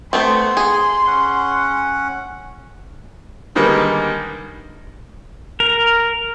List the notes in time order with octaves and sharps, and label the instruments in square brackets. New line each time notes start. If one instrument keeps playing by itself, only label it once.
[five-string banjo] A3 B3 C4 [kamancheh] C6
[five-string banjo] G#4
[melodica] C#4 F#5
[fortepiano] D3 D#3 G3 G#3 A#3 B3
[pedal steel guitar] A#4